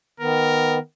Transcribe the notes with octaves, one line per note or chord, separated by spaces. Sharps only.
D#3 B3 A#4